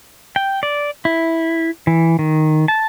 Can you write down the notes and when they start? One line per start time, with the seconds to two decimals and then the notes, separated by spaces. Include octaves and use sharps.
0.36 G5
0.63 D5
1.05 E4
1.87 E3
2.19 D#3
2.68 A5